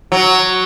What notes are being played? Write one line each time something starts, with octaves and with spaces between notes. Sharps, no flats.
F#3